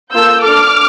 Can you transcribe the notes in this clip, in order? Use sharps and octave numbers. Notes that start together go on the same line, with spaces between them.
A#3 F4 A4 E6 G6
D4 A4 D6 F6